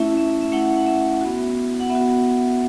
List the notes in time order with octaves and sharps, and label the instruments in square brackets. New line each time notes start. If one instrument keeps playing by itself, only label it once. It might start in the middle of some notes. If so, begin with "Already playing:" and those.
Already playing: [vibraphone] A3 C#4 E4 E5
E5
E5
A3 C#4 E4 F#5
F#5
E5
B3 F#4
F#5
B3 E5
F#4